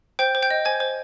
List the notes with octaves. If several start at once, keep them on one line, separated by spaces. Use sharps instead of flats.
C5 G5 G6
C5
G5 G6
D#5
C5 G#5 G#6
C5